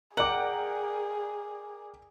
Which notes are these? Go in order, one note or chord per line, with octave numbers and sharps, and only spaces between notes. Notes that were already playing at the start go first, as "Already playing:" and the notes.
G#4 A#4 D5 F#5 G5 D6 F#7